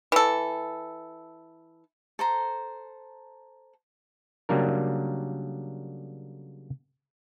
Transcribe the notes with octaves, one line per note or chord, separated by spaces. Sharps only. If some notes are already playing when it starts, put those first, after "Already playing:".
E3 A4
A4 C5 A#5
C#3 F#3 G3 A#3 D4 A#4